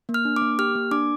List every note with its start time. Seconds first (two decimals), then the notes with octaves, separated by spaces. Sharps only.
0.09 A#3
0.14 F6
0.25 D4
0.36 D6
0.42 A#3
0.59 G4 F6
0.75 A#3
0.91 D4 D6